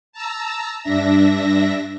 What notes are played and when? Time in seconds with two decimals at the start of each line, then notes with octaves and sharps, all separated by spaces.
0.13 A5 A#5 E6
0.82 G2 D4 E5 A#6